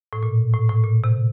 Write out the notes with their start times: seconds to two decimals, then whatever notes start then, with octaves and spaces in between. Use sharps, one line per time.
0.13 A2
0.23 A#2
0.53 A2
0.69 A2
0.84 A#2
1.04 C3